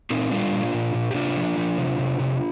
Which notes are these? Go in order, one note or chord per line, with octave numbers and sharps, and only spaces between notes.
A#2 C4 D#4
G3 D4 F4
A#2
A#2
A#2
G4
C3 D4 F4
F3
F3
C3
C3
C3